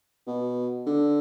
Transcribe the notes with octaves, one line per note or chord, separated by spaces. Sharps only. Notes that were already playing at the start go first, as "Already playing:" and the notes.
B2
D3